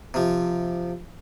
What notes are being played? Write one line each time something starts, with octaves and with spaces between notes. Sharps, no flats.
C3 F3